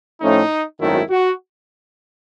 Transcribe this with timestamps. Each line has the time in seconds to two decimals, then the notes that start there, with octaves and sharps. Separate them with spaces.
0.21 A2 F3 A3 C#4 D#4
0.80 G#1 F#2 D#3 F#3 A3 E4
1.10 F#4